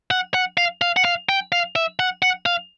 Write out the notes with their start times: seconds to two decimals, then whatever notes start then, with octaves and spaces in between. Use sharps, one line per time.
0.11 F#5
0.34 F#5
0.58 F5
0.82 F5
0.97 F#5
1.05 F5
1.29 G5
1.52 F5
1.76 E5
1.99 F#5
2.22 F#5
2.46 F5